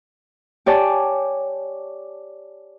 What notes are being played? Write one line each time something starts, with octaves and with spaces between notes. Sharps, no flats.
G4 C#5 D5 G#5 A5